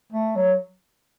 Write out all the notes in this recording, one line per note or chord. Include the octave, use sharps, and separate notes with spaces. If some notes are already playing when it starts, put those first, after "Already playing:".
A3
F#3